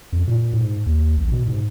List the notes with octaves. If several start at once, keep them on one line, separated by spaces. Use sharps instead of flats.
F2
A#2
G#2
D#2
A1
B2
G#2